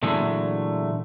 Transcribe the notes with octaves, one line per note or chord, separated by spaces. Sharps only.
A#2 D3 E3 F#3 G#3 A3